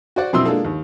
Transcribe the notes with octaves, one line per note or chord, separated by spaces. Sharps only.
F#4 C5 D5 F#5
F#2 B2 C4 E4 C6 E6
G#3 A#3 D4 F4 A4
D#2